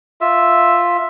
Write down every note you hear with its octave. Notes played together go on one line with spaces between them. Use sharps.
F4 E5